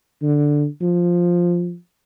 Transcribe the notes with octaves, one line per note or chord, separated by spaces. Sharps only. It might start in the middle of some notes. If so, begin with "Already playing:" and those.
D3
F3